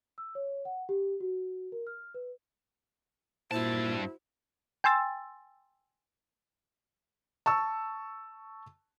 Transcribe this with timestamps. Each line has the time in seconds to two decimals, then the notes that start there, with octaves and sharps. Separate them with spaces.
0.18 E6
0.35 C#5
0.65 F#5
0.89 G4
1.20 F#4
1.72 A#4
1.87 F6
2.14 B4
3.51 G2 A#2 E4 F#4 C5 A5
4.84 G5 G#5 C6 E6 A6
7.46 A5 C#6 E6